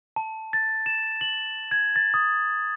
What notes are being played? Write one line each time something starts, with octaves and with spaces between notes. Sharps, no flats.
A5
A6
E7
F#7
G#6
A6
D#6